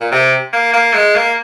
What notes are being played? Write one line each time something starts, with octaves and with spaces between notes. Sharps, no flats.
A#2
C3
A#3
A#3
G#3
A#3